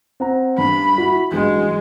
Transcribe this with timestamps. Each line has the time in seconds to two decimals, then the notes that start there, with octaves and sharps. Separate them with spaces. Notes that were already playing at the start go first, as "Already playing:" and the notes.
0.20 C4 F#5 A#5
0.58 G2 B5
0.98 E4 F#4
1.32 A1 G2 F#3 G#3